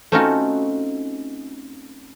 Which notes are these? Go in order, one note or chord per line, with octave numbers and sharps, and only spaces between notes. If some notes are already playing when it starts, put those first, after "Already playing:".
A3 C4 C#4 D#4 F4 F#4